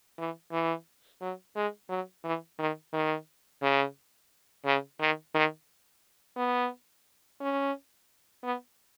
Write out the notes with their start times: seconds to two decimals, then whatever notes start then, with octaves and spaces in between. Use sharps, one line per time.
0.18 E3
0.52 E3
1.21 F#3
1.56 G#3
1.90 F#3
2.24 E3
2.59 D#3
2.93 D#3
3.62 C#3
4.65 C#3
5.00 D#3
5.35 D#3
6.37 B3
7.40 C#4
8.43 B3